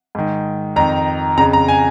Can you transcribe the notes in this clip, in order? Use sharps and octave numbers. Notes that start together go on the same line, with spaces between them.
G#2 D#3
F2 D#3 A#5
F2 C#3 A#5
A#5
G#5